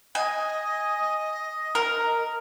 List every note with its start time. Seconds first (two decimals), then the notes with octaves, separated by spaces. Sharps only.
0.15 D#5 G#5
1.75 A#4